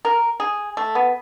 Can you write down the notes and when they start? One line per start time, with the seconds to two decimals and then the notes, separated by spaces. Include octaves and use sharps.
0.05 A#4
0.40 G#4
0.77 A3
0.95 B3